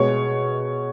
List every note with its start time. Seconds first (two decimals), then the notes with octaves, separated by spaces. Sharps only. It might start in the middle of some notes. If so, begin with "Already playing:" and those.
Already playing: B2 G#3 C#5